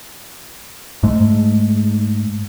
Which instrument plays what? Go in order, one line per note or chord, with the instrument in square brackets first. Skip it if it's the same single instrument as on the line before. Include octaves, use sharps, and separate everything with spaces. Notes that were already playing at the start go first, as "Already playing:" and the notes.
[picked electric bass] G#2 G#3 A3